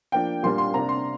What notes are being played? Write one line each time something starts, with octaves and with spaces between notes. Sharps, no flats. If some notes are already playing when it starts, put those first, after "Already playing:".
F3 A#3 D4 G5
A#2 G3 A#3 D4 C6
C6
C3 A#3 D4 A#5
C6